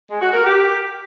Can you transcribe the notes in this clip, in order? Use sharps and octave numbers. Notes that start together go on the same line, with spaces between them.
G#3
F#4
A#4
G4